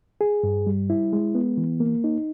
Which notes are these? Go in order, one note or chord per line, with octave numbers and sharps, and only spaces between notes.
G#4
G2
G3
E4
G#3
B3
E3
A#3
D#4